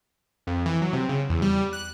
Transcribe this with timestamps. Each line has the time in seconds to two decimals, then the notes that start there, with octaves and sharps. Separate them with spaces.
0.47 F2
0.66 E3
0.82 F#3
0.93 C3
1.09 C#3
1.30 E2
1.42 G3
1.73 F#6